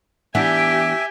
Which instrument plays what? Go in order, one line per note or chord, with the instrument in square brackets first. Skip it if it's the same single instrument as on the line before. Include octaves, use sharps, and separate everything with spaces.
[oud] E3 B3 D4 [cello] G4 G5 [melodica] E5 [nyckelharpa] G#5